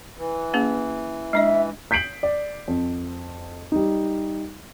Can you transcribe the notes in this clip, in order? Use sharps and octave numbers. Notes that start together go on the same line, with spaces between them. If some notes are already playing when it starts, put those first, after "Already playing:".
E3
A#3 C#4 G#4
G#3 D4 D#5 E5
G6 B6 C7 D7 F#7
D5
F2
G3 D#4